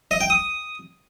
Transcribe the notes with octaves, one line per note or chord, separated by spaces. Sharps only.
D#5
G5
D#6